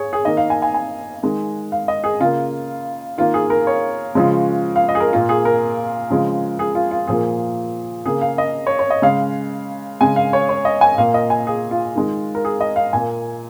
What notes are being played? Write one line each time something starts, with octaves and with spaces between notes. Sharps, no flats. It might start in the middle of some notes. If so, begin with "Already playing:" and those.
Already playing: G#4 C#5
G#4
D#3 A#3 D#5
F5
G#5
G#5
G#5
D#3 G#3
F5
D#5
G#4
C#3 A#3 F4
D#3 A#3 F4
G#4
A#4
C#5
C#3 F3 G#3
F5
D#5
G#4
A#4
A#2 A#3 F4
G#4
A#4
C#3 F3 G#3
G#4
F4
F4
A#2 F3 A#3 G#4
C#3 A#3 G#4
F5
D#5
C#5
C#5
D#5
C#3 G#3 F5
C#3 G#3 G#5
F5
C#5
C#5
D#5
G#5
A#2 A#3 F5
D#5
G#5
G#4
F4
D#3 G#3
A#4
G#4
D#5
F5
A#2 A#3 G#5